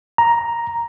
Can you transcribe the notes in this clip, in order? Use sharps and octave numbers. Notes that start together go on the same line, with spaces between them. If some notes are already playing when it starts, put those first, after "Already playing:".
A#5